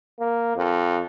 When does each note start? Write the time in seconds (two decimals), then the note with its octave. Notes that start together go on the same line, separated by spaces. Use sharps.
0.20 A#3
0.56 F2